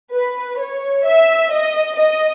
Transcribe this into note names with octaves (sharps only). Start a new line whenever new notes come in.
B4
C#5
E5
D#5
D#5